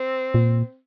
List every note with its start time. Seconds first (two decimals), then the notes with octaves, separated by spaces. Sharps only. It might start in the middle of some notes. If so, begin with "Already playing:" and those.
Already playing: C4
0.34 A#2